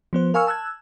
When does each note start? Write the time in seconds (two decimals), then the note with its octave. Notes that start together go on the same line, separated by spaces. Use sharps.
0.13 F3 B3 C5
0.34 A#4 F5 G#5 C#6 E6 F6
0.47 A5 E6 F#6 G#6